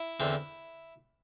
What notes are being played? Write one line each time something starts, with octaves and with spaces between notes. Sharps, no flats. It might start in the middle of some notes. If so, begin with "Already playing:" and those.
Already playing: E4
E2 D3 C4